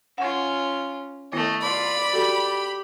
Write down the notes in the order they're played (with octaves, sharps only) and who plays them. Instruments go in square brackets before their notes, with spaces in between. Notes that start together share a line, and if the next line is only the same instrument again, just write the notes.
[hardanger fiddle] C#4 F4 [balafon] F#5 C#6
[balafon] D#3 B3 E4 [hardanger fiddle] A3 D#5
[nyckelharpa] F4 [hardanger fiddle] D5 [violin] B5
[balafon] F#4 A4 [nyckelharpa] G4